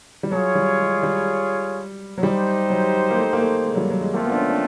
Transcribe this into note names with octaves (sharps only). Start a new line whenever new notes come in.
G3
F#3 F4 G#4 C#5
G3
G#3
G3
F#3
G3 D#4 G4 C5
F#3
A#3
A3
A#3
A3
G#3
F#3
G3
F#3
G#3
A3 A#3 C4 F4
B3
D4
C#4
D4